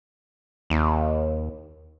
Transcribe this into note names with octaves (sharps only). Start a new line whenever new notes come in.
D#2